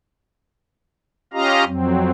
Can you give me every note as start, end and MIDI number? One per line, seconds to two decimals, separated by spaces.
1.33 1.64 61
1.33 1.64 65
1.33 1.64 67
1.33 1.64 75
1.33 1.64 77
1.33 1.64 82
1.65 2.11 41
1.65 2.11 54
1.65 2.11 60